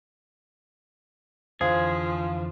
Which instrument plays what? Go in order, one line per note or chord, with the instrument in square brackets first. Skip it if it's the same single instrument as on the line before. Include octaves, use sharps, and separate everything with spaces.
[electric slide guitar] F2 D3 E3 [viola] F3 [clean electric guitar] G#4 [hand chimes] C5 F5